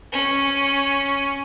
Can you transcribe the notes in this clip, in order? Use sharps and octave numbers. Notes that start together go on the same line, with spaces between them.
C#4